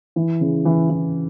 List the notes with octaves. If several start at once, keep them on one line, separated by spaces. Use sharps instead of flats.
E3
C#3
E3
E3